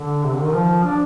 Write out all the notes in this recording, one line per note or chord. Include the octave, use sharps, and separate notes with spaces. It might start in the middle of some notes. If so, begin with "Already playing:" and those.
Already playing: D3
C3
D3
D#3
F3
D4